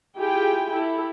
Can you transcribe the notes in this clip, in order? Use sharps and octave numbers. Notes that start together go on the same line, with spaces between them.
E4 F4 G4 G#4 G5 G#5
E4 G4 A4